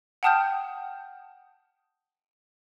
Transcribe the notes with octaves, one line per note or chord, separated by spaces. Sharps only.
F#5 G5 A5 D#6 F6 G6